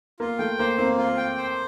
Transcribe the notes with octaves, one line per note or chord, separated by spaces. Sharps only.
A#3 F4
A3 G5
A#3 C5
A#3 C4
F4
G5
C5